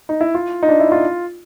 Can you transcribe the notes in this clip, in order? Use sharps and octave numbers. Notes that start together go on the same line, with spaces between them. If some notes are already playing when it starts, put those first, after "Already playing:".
D#4
E4
F4
D#4
D4
E4
F4